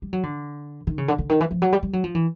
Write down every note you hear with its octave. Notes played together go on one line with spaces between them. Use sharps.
G3
F#3
D3
D#3
C#3
D3
D3
D#3
E3
F3
F#3
G3
G3
F#3
F3
E3